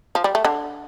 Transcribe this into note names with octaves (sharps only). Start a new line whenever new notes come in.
F3
G3
A3
D3